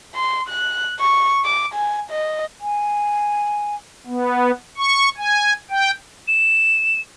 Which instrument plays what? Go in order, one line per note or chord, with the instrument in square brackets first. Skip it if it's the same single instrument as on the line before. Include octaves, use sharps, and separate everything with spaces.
[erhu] C6
F#6
C#6
D6
G#5
D#5
[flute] G#5
[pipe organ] B3
C#6
G#5
G5
[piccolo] E7